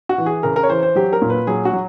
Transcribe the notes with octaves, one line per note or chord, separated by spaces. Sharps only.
F#4
E3
G#4
C#3 A#4
A#4
C#5
E3 C5
C5
F#3 G4
A#4
A#2
B4
F#3 G#4
F#4
F#3